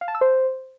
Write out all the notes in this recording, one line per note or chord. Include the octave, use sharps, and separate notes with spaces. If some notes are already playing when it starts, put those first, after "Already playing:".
F5
A5
E6
C5